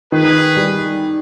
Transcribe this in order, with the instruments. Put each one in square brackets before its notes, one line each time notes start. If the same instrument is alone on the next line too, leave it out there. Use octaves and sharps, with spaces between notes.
[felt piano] D#3 [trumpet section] G#4 B4
[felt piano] G3